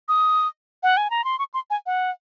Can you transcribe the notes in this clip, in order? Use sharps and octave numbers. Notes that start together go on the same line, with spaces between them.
D#6
F#5
G#5
A#5
C6
C#6
C6
G#5
F#5